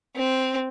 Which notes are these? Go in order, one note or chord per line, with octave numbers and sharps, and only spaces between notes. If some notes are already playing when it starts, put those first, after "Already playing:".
C4